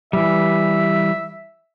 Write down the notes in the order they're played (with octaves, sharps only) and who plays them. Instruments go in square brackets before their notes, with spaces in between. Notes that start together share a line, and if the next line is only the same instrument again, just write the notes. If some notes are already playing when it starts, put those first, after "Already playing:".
[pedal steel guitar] E3 G3 [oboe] E5